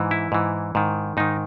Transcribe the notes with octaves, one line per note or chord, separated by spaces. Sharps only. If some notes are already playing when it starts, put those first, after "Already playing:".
Already playing: G#2 E3
E4
G#2 E3
G#2 D#3
G#2 D#3 D#4